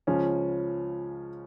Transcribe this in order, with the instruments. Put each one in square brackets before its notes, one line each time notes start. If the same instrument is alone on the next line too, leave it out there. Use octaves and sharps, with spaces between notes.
[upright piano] C#2 C#3 F3 C#4